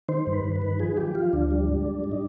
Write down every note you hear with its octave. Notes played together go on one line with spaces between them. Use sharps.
D#3 C5
G2
B4
G2
B4
D#3
F3 G#4
F3 G4
F3 F4
D2 D4
G3
G#2
G3
G3
D#4